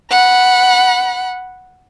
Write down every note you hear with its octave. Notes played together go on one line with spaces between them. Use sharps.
F#5 B5